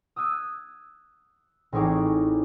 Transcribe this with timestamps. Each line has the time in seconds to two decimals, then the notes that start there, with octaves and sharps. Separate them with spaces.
0.16 D#6 E6 F#6 G#6 D#7
1.72 A1 C4 D#4 G#4 C#5 D6